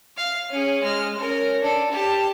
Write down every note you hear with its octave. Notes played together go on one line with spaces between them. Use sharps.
F5
C#4 G#4
G#3 F6
C#4 A#4
D4 A4
G4 A5